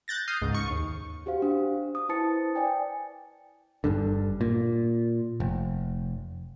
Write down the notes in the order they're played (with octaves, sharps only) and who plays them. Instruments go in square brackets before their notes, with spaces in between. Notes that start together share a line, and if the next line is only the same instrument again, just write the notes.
[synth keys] F#6 G6 A6 A#6
D#6 F6 G6 C7
C#2 G#2
C#6
D#2
[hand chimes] F#4 G4 C5 F5
D4
D#6
E4 B4 C5 A5 A6 C#7
D5 G5 G#5
[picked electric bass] G1 G2 D3
A#2
F1